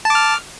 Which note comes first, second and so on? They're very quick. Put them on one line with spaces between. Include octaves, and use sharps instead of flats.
A5 D6 F6